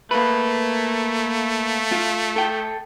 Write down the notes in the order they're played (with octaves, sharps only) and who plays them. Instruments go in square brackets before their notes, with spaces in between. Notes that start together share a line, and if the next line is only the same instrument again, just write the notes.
[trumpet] A3 [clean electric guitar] A#3 B4
[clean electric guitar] F4
A4 G5